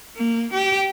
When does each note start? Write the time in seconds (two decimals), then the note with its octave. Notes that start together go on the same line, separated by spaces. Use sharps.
0.16 A#3
0.54 G4